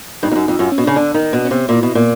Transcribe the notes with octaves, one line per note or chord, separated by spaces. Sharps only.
G2 D#4
F2
F#2
F2
F#2 F4
C#4
B2
C#3 D4
D3 D4
D#3 D#4
B2 D4
C#4
C3
A#2 E4
B2
A#2